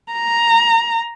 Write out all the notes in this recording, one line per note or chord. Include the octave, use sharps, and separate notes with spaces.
A#5